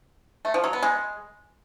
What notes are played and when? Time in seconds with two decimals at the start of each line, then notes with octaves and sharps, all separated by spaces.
0.45 A3
0.54 F3
0.64 F#3
0.73 B3
0.83 G#3